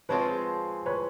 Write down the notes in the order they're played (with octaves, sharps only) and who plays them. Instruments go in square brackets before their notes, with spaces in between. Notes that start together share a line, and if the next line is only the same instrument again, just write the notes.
[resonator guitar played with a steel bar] F3 G#3 C4 F4 G#4 [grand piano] B4 C#5
[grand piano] B4 C#5